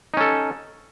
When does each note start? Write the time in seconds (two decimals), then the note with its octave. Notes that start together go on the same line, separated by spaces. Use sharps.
0.14 D#4
0.17 C#4
0.21 A4